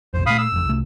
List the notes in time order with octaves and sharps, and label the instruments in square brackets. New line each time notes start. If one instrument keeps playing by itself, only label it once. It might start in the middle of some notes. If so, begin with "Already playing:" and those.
[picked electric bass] F1 B1 F2 [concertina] C5
[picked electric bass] A#2 A3 [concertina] F5 B5 D#6
[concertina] E6
[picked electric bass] F#1 F2
C2 A3